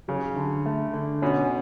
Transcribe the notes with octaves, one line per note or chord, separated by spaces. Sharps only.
C#3 F#3
D3
A3
D3
B2 C#4